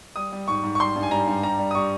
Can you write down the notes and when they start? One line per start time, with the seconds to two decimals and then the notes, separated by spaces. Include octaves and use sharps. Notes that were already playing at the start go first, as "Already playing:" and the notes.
0.16 G3 D#6
0.32 G3
0.48 G#2 C#6
0.64 G#2
0.75 C#6
0.80 G3 C6
0.96 G2
1.03 G#5
1.11 G3 A#5
1.27 G2
1.43 G3 A#5
1.59 G3
1.71 D#6
1.75 G3 C#6